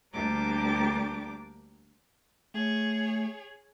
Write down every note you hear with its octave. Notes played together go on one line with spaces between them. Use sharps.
D2 G3 A#3 D4 G4 D6
A3 G#4 C#5